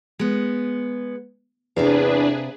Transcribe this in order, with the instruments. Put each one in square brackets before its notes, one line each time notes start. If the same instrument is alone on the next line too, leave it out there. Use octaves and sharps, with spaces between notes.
[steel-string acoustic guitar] G#3 B3
[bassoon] E2 [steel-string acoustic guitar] C3 E5 F5 [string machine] D4 G#4 B4